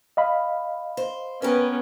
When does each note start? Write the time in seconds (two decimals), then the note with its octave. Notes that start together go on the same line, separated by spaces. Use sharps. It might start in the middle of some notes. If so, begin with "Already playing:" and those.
0.17 D#5 F5 B5
0.97 C5
1.42 B3 C#4 G4 A#4 B4